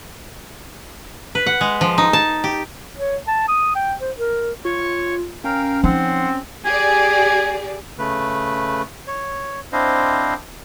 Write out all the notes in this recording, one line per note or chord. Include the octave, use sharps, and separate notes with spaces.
B4
F#5
G#3
F3
D#4
A5
G4
C#5
A5
D#6
G5
C5
A#4
F4 C#5 C#6
C#4 A#4 F5 G5
F3 C4 D#4 F#5 C6
G4 G#4 D5 G#5
C#3 A3 B4
C#5
C4 D4 E4 C5 D#5 F5